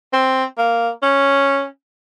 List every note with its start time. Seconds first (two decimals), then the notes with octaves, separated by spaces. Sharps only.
0.13 C4
0.58 A#3
1.02 C#4